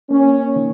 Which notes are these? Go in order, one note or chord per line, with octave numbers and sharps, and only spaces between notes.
A#3 C#4
D#3